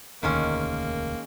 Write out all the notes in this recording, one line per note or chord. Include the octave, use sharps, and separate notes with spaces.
E1 D2 D#3 G#3 A#3 C#4